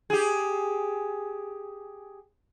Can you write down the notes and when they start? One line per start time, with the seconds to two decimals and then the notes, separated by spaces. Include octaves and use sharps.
0.10 G4 G#4